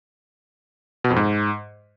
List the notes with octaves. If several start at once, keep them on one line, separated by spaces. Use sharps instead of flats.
B2
F2
G#2